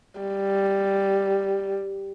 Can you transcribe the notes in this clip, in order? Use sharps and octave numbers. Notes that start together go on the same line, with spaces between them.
G3